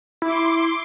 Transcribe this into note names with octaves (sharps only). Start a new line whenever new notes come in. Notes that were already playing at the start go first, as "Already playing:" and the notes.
E4 C6 D6